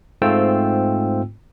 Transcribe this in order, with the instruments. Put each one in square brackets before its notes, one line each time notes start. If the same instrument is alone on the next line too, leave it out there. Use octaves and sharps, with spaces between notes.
[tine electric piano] G#2 A3 C4 F4 G5 E6